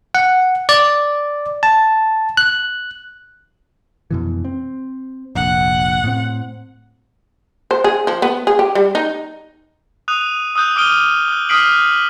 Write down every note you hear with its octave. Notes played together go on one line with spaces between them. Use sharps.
F#5
D5
A5
F#6
F2 B2 E3
C4
F1 A#1 F#5
A2 C4
C5
G#4
F3
B3
G#4
G4
G3
D#4
D#6 F#6 D#7 F7
D#6 E6 F#6 G6
D6 D#6 F6 D7 D#7 G7
E6 F#6
D#6 F6 B6 C7 D7 F#7
F#6